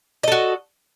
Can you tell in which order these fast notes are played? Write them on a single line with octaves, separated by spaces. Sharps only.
D#5 A4 F#4